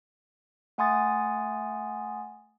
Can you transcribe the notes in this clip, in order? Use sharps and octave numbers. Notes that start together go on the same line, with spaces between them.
A3 F#5 G#5 C6 D#6 A6